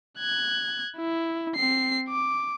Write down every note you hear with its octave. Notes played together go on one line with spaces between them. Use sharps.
F#6 G#6
E4
C4 C7
D6